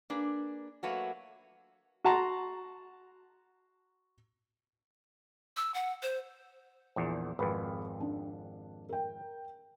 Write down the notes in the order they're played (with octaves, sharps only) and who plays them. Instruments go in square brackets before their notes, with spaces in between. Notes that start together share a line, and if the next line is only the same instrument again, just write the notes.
[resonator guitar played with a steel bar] A#3 D4 G#4 B4
F#3 A3 A#3 F#4 B4 C#5
[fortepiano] F#4 F#5 A5 A#5 C6
[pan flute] E6
F#5
C5
[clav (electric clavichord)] A#1 E2 A#2
[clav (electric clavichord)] G#1 F2 [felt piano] B4 B5
[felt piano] D4
A#4 G5